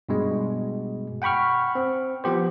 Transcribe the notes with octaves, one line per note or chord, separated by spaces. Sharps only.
G2 B2 G#3
F#5 G5 B5 C#6 F6
C4
F3 B3 G4 C5